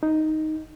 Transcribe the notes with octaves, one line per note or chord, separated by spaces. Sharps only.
D#4